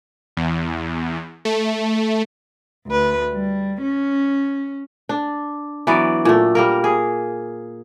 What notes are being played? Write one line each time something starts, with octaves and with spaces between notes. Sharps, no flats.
E2
A3
D2 B4
G3
C#4
D4
E3 F#3 B3 D5
A#2 A3
G3 A#3 A#4
G#4